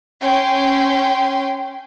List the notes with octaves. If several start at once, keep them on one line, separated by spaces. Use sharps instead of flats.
C#4 G5 C6